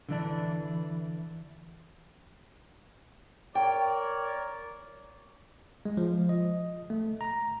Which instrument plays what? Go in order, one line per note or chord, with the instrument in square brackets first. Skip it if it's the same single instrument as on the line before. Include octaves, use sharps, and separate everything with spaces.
[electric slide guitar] D3 E3 D4
[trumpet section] A#4 C#5 D5 [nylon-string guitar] G5
[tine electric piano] G#3
F3
D#5
A3
A#5